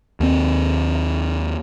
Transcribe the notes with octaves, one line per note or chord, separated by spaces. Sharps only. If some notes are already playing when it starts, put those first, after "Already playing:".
D#2 C4